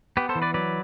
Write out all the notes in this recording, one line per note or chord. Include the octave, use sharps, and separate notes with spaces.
B3 G4 B4
A4 C5
E3
B4 D5
F#3 B4 D5